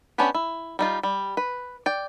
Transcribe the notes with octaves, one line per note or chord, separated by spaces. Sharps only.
B3 C#4 D4 G4 B4
E4
G3 D#4 F4
G3
B4
D5 G5